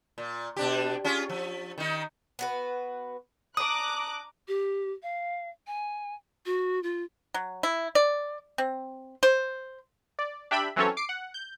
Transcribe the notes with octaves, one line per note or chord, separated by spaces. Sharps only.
A#2
B2 D4 G4
C#4 F4 G#4
F3
D#3 D#4
B3 F#4 B4
D4 A#5 D6 D#6 F#6
G4
F5
G#5
F#4
F4
F#3
E4
D5
C4
C5
D5
D4 G4 E5 G5 B5
E3 F#3 C4 C#4 A4 C#5
D6 C7 D7
F#5
G6